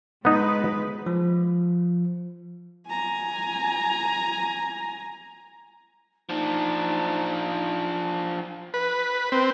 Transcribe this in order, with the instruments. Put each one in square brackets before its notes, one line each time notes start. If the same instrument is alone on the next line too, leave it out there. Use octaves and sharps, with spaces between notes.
[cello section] G#3 B4 [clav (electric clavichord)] B3 D#4
[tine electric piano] F3
[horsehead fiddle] G#5 A#5
[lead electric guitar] F3 D4 [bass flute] D#4
[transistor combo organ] B4
C4